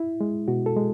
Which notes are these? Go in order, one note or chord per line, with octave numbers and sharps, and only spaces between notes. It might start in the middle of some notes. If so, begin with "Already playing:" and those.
Already playing: E4
G#3
B2 F#4
A4
G#3